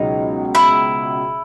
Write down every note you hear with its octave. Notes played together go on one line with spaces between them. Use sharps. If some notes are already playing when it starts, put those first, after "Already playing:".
Already playing: C#2 B2 F#3 D#4
E4